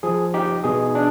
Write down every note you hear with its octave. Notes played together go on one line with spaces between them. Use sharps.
F3 G#4
D#4 G4
B2 G#4
D4